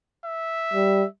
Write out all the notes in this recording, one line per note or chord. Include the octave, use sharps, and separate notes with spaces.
E5
G3